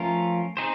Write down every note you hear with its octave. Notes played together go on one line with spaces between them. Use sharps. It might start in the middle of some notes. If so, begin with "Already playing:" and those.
Already playing: F3 A3 C#4 F4 A#4
C4 D#4 G#4 C5